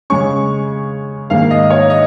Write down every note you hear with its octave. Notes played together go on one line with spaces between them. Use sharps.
C#3 G#3 C#4 C#6
G#2 D#3 A#3 F5
D#5
C#5
D#5